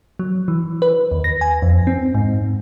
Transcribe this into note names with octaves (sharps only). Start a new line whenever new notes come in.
F#3
E3
B4
D#2
A#6
G#5
F2
C4
G#2